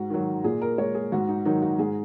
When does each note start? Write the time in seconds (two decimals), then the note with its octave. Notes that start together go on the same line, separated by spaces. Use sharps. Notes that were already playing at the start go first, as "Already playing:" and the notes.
Already playing: G#2 F#4
0.10 D#3 F#3
0.44 A#2 G#4
0.62 A#4
0.78 G#3 C#5
0.95 G#4
1.12 G#2 F#4
1.29 D#4
1.45 D#3 F#3 D#4
1.62 F#4
1.79 G#2 G#4